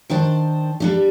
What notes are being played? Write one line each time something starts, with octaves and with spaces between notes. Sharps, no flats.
D#3 D4 C5 A5
G3 D4 G4